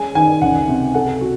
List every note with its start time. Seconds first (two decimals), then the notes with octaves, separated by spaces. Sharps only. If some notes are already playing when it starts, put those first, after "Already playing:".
Already playing: G#3 C#4 G#4 G#5
0.15 D#3 G#5
0.41 C#2 F#5
0.68 C3
0.95 A4 F#5
1.21 F#4